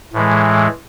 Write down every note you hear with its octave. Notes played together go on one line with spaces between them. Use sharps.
A2 E3 G#3